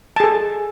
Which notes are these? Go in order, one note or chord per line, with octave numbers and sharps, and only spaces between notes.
G#4 A4 A5